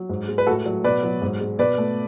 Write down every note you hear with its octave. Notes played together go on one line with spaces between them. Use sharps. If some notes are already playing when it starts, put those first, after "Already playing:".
Already playing: F#3
G#2
G#3
B4
A2 F#4 A4
F#3
B2 B4 D5
F#3
G#2
G#3
B2 B4 D5
A3